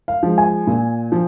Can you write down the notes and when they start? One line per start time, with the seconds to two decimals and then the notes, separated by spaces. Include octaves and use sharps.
0.08 F5
0.23 F3 G#3
0.38 G#5
0.67 A#2
1.12 F3